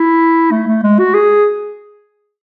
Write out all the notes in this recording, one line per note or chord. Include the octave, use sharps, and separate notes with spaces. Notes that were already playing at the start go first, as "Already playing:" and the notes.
Already playing: E4
A3
A3
G#3
F#4
G#4